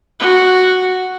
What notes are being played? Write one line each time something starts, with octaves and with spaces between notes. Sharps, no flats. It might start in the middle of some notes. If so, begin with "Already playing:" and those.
F#4